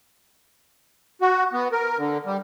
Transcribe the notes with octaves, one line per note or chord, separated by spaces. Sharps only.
F#4
B3
A#4
D3
G3